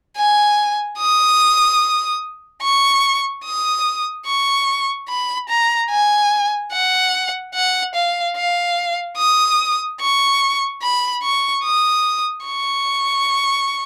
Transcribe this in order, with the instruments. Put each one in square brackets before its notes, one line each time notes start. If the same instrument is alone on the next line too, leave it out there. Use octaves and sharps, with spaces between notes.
[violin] G#5
D#6
C#6
D#6
C#6
B5
A#5
G#5
F#5
F#5
F5
F5
D#6
C#6
B5
C#6
D#6
C#6